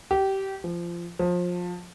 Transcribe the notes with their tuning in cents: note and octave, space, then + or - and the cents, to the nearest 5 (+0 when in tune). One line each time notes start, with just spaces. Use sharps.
G4 -20
F3 -20
F3 +25